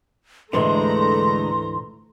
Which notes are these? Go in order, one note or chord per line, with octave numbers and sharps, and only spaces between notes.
D2 G#2 D3 E3 G#3 A3 A#5 C6